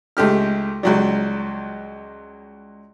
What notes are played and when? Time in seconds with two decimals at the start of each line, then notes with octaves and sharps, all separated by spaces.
0.17 C#2 A3 G4 F6
0.83 C#2 F#3 G3